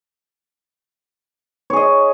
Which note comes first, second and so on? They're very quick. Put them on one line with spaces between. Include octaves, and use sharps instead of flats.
C#5 G#4 D#5